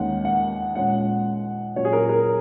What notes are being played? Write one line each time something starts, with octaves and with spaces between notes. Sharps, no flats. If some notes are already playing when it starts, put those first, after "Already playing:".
Already playing: D#2 D#3 G#3 C#4 F#5
F#5
A#2 G#3 C#4 F#5
A#2 F#3 C#4 C#5
G#4
A#4
A#4